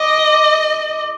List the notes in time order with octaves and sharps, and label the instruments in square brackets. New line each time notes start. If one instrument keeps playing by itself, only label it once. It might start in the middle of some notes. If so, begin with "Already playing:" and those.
Already playing: [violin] D#5 [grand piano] D6